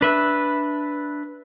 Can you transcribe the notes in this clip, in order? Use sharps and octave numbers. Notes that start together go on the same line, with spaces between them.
D4 B4 E5